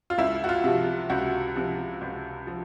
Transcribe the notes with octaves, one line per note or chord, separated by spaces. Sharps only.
F4
C#2 E4
F#4
F4
C3 F3
C#2 F#4
C3 F3
C#2
F3